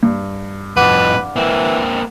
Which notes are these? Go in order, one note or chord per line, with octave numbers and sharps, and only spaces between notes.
G2
F2 A2 B4 F#5 D6
E3 A#3 C4